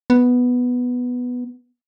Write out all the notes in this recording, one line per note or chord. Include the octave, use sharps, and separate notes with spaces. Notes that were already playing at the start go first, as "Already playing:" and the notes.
B3